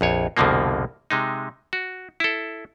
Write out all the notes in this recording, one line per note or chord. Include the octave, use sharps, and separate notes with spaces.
A#1 F2 C#5
C2 F2 B2 D3 F3 A#3
C3 G#3 D#4
F#4
E4 A4